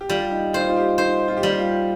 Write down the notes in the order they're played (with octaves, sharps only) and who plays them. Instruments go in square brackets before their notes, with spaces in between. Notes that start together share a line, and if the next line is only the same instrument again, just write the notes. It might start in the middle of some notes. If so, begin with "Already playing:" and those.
[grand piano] G4
[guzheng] G3 [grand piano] F4
[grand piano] D#4
[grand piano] F4 [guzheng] C5
[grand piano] D#4
F4
G4
[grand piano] D#4 [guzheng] C5
[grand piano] F4
G4
[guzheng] G3 [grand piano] F4
[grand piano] F4